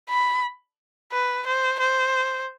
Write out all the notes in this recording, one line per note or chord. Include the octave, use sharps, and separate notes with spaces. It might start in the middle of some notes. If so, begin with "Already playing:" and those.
B5
B4
C5
C5